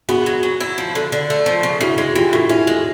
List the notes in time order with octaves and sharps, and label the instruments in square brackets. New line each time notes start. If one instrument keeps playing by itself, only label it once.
[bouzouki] B3 [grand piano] F#4 G#4
[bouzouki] F#3
F#3
E4
F3
D3
D3
A3
F3
C#3
[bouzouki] C#3 [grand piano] E4 F#4
[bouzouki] G#3
[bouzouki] E3 [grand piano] F4 G4
[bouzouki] A2 [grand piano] E4 F#4
[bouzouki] C#4 [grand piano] E4 F#4
[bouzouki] G#3